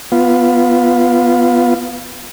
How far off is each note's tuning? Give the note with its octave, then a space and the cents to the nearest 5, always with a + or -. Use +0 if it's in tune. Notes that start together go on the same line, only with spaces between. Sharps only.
B3 +0 F4 +0